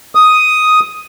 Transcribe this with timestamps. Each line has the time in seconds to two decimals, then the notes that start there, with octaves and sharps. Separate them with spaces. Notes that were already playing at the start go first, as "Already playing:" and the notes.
0.15 D#6